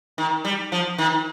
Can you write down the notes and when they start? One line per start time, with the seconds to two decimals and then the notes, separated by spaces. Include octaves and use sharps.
0.18 D#3
0.45 G3
0.72 F3
0.98 D#3